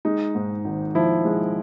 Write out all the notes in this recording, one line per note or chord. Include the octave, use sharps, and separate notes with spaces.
G#3 D#4
G#2
G#1
F3 E4
G#3